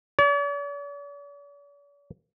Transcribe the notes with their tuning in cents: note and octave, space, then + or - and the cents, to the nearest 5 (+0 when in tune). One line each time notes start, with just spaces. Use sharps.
D5 -45